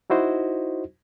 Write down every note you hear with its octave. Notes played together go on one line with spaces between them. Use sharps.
D#4 E4 F#4 C5 D#5